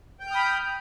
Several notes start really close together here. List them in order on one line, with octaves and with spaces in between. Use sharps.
G5 G6 F6 D#6 B5